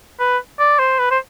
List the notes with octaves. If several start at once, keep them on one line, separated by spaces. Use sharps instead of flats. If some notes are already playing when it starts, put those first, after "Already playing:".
B4
D5
C5
B4
C5